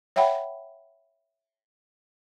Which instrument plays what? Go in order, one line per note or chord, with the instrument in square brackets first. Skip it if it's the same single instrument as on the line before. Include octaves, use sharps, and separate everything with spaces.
[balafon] C#5 E5 F#5 G5 B5